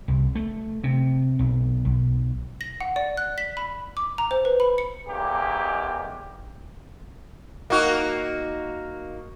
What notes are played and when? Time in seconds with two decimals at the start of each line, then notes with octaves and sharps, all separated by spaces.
0.08 C2
0.35 A3
0.84 C3
1.39 B1
1.85 B1
2.61 A#6
2.80 F#5
2.96 D5
3.17 F#6
3.38 B6
3.57 B5
3.97 D6
4.18 A#5
4.31 C5
4.45 B4
4.60 B5
4.78 C#7
5.08 B1 E2 G#2 A#3 G4
7.70 A#3 D#4 F#4